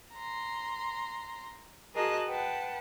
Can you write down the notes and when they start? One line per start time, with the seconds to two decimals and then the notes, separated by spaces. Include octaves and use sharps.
0.16 A#5 C6
1.95 F#4 G#4 A#4 D#5 A5 F#6
2.27 B4 F#5 G5 A5